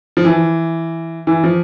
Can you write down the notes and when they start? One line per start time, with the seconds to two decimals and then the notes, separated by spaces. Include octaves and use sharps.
0.17 F3
0.25 E3
1.27 E3
1.44 F3